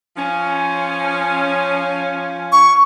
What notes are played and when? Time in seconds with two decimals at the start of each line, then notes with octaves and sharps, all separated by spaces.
0.17 F3 C#4
2.52 C#6